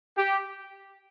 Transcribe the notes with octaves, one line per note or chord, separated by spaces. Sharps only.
G4